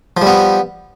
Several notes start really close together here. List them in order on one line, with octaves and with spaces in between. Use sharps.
F3 G3 B3